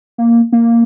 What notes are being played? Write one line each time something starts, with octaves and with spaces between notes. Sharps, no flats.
A#3
A#3